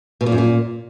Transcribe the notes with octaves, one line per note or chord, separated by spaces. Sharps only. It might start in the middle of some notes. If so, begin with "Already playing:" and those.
B2
A#2
F#2
A#2